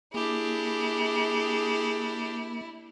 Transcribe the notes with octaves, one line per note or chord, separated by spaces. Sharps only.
A#3 D4 E4 G4 G#4